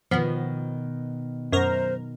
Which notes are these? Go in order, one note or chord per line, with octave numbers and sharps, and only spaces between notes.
B2 D#3 F3 B3
F#2 A#4 C5 A#5